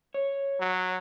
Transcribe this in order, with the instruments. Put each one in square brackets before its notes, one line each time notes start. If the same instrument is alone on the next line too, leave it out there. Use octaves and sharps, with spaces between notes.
[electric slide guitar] C#5
[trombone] F#3